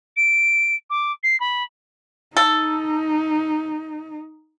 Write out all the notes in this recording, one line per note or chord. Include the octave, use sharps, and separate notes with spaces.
D7
D6
C7
B5
D#4 A4